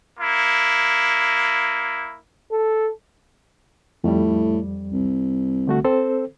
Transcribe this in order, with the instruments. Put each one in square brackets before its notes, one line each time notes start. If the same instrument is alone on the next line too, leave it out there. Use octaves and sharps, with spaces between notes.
[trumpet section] A#3 E4
[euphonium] A4
[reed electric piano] F2 G3 [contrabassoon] A2
[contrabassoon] C2
[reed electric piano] D3 A3 F#4
C4 A4 C5